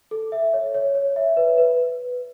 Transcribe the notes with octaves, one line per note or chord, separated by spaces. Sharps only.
A4
E5
C#5
C#5
C#5
E5
B4
B4